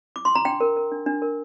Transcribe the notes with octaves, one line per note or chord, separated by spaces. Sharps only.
D6
C6
A#5
D4 G5
A#4
A#4
D4
D4
A#4